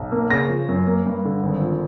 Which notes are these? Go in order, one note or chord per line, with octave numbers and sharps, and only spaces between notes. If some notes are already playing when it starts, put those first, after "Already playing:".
Already playing: B1
A#3
C#3 A#6
F3
F#2
A#3
G2
D3
G#1
F3